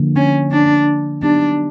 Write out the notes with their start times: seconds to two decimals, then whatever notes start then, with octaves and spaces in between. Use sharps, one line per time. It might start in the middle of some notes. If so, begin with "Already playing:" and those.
Already playing: D3 F3 A#3
0.16 C#4
0.51 D4
1.22 F#3 B3 D4 D#4 G4